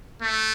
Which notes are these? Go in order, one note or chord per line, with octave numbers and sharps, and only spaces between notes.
A3